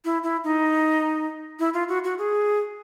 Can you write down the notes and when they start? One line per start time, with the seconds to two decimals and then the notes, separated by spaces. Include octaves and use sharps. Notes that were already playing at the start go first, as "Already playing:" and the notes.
0.05 E4
0.23 E4
0.44 D#4
1.59 E4
1.74 F4
1.89 F#4
2.04 F#4
2.18 G#4